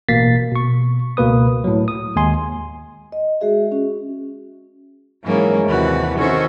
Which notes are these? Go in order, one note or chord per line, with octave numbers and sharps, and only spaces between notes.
A1 B2 A#3 A6 B6 C7
B2 C#6
C#2 B2 A#3 B4 D#6
A2 F#3
D#6
D#2 G#3 G#5 C6
D#5
G#3 F#4 G#4 E5
C#4 F#4
G#2 E3 F#3 G#3 A#3 C#4
D#2 C3 E3 F#4 B4
C3 D#3 C#4 F#4 A4 C5